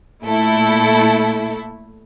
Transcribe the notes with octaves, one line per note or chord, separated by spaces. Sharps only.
A#2 A3 E4 A4